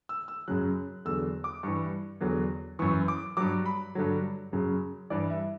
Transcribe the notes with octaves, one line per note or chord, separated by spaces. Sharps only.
E6
E6
F#2 C#3 F#3 F#6
E2 D3 F#3 E6
D6
G2 E3 C#6
E2 D3 F#3
F#2 E3 C#6
D6
G2 F#3 D6
B5
G2 D3 F#3
F#2 C#3 F#3
G2 E3 D5
E5